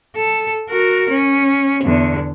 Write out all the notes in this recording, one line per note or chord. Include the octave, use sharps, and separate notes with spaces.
A4
F#4 A#4
C#4
E2 D3